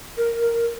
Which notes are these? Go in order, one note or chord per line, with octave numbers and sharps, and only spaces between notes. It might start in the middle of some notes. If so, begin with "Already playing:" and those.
A#4
A#4